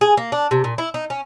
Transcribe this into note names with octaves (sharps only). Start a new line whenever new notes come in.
G#4
A#3
D4
C3
A#2
E4
D#4
C#4